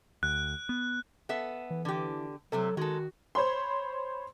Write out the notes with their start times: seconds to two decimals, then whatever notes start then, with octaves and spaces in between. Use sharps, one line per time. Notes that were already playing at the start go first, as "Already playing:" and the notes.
0.23 D2 F#6
0.69 B3
1.29 B3 A4 E5
1.70 E3
1.85 D3 G4
2.52 C3 F#3 A3 C4 A4
2.77 D#3 G#3 F#4 A4
3.35 C5 C#5 B5 C6